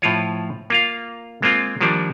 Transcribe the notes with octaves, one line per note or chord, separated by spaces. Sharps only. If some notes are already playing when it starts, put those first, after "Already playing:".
A2 F3 F4 C#5
A#3 F4 F5
G#3 A#3 C4 F4
D#3 F3 G3 A#3 D4